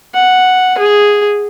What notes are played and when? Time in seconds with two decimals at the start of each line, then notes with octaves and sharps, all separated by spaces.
0.14 F#5
0.78 G#4